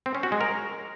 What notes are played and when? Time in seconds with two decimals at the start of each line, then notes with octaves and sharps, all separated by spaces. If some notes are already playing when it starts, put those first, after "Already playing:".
0.06 C4
0.15 C#4
0.23 F#4
0.32 G#3
0.41 A#4